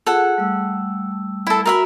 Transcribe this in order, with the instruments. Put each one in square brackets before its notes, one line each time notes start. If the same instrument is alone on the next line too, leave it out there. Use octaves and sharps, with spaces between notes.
[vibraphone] F4 G#4 [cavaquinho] A4 F#5
[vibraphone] G3 A3 E6
[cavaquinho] E4 A4
[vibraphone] F#4 [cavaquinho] A#4 E5 B5